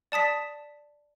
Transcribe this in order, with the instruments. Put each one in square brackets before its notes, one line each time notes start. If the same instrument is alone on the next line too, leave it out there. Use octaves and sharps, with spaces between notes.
[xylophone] D5 A5 D#6 B6